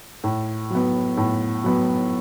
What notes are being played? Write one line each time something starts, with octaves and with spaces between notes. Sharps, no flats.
A2
F#3 B3
A2
F#3 B3